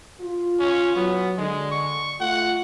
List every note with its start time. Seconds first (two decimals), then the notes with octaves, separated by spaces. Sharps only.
0.21 F4
0.59 C#4
0.95 F#3 B3
1.37 D3 G#3
1.71 C#6
2.20 A3 F4 F#5